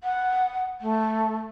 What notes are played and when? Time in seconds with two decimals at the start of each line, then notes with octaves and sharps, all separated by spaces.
0.04 F#5
0.81 A3